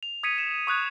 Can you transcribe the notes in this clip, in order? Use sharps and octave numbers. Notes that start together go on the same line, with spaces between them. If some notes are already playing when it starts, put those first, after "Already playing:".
F7
D#6 G#6 B6 C#7 D#7
E7
C#6 D#6 F#6 G#6